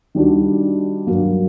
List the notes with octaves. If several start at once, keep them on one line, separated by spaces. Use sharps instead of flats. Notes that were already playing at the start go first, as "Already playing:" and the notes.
D#3 G3 D4 F#4
G2 F#3 A#3